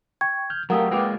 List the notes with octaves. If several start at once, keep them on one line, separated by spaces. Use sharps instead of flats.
G5 C#6 G#6
F6 G6
F#3 A3 G4 A#4 F5 F#5 D#6 E6
G#3 A#3 F4 B4 G5 D6